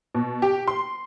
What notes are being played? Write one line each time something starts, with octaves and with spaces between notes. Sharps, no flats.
B2
G4
C6